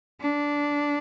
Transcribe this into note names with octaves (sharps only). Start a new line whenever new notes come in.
D4